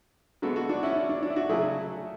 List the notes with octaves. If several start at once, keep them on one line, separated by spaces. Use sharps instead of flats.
D3 G#3 B3 F#4 A4
F#4 A4
D4 F#4
C#4 E4
D4
D4
D4
E4
D4 F#4
C#3 F#3 A3 E4 G#4